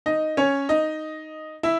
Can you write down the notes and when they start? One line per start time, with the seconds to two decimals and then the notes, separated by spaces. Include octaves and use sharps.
0.06 D#4 D#5
0.37 C#4 C#5
0.69 D#4 D#5
1.63 E4 E5